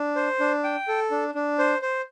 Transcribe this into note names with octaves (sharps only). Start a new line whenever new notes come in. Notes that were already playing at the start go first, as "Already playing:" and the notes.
Already playing: D4
C5
D4
G5
A4
D4
D4
C5
C5